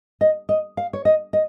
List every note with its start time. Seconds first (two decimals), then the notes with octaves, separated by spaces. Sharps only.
0.21 D#5
0.49 D#5
0.77 F5
0.93 C#5
1.05 D#5
1.33 D#5